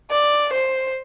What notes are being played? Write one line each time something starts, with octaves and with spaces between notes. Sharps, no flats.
D5
C5